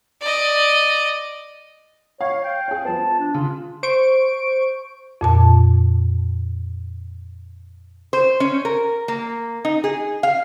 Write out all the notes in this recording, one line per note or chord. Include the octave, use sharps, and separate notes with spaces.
D5 D#5
C#5 F5
G5
G#4 C#5
F3 B3 A5
D4
C#3 F4
C5 C#6 D7
F2 A#2 A5
C5
C#4
A#4
A#3
D#4
G#4
F5